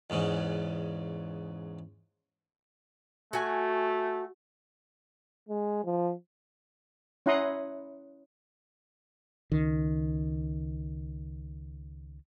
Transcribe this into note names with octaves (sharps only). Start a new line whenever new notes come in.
E2 G#2 C#3
A3 F#4 G#5
G#3
F3
C#4 E4 F#5 A#5 C6 D#6
C#2 D#3